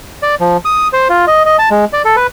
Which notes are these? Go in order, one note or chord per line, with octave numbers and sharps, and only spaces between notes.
D5
F3
D#6
C5
F4
D#5
D#5
A5
G#3
D5
A4
B4